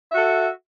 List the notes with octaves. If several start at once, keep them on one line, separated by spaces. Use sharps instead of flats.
F#4 A4 E5